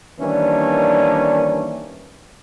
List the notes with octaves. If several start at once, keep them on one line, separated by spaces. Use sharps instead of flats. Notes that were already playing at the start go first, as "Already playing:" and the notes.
D#3 E3 G3 A#3 C#4 D4